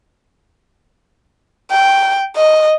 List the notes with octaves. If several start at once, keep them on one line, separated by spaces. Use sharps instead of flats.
G5
D#5